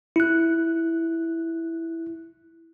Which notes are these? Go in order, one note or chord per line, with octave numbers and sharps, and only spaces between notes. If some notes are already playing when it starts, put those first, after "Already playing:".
E4 F#6